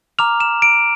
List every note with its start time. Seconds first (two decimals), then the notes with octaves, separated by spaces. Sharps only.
0.19 A#5 D6 F6 F7
0.40 E7
0.62 D7